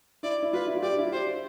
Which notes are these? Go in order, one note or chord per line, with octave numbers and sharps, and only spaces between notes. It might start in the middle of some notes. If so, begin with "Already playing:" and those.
E4 D5
E4
F4 B4
E4
F4
G4 D5
D4
E4
F4
G4 C5